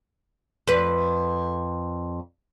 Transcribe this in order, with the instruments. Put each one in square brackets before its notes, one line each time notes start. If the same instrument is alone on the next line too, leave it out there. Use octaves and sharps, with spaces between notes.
[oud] F2 B4